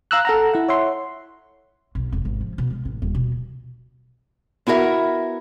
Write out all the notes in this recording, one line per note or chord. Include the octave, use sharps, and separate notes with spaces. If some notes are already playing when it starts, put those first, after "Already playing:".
F5 A#5 E6 F#6
A4 F#5 A#5
E4 F#5
C#5 E5 F#5 C6
B1
E1
G#1
F3
B2
G#3
A1
D#1
B2
B3 E4 F#4 A#4 E5